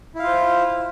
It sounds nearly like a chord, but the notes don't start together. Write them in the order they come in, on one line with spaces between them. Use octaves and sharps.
E4 F5 F4 C5